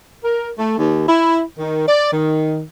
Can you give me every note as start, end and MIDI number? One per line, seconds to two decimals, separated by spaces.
0.23 0.49 70
0.57 0.75 57
0.78 1.03 39
1.07 1.41 64
1.57 1.86 51
1.86 2.11 74
2.11 2.62 51